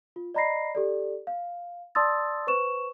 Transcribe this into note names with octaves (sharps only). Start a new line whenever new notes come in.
F4
D5 D#5 A#5 B5 A#6 C7
G4 A4 D5
F5
D5 A5 C6 D#6 E6 A6
B4 C5 C#6 E7